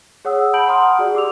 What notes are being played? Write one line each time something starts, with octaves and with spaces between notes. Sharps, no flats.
G#4 C#5 F#5 D#6 E6
F#5 A5 B5 G6 D7 F#7
F#5 A#5 C6 D#6 F6
F#4 G#4 D5
G4 D6 E6 F7